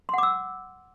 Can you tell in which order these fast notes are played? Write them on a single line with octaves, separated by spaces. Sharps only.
C6 F#5 D6 E6